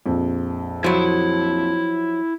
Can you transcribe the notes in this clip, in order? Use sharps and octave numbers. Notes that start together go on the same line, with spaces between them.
A#1 F2
F3 F#3 E4 B5